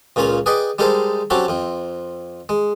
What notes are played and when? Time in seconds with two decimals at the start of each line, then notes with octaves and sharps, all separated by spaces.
0.16 C#2 A#2 C#4 F4 G#5 A#5
0.46 G#4 B4 D5 D#5 G5
0.79 G3 G#3 D#4 A4 A#4 C5
1.30 F#3 C4 C#4 F#4 G4 A4
1.48 F2 C4
2.49 G#3